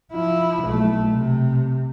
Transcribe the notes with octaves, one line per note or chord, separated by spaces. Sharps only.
F3 E4
B1 A3
C3